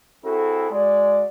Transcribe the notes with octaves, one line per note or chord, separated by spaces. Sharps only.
C4 E4 F#4 G#4 A4
G#3 F#4 D5